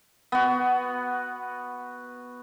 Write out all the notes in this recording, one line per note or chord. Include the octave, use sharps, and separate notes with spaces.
B3 F#4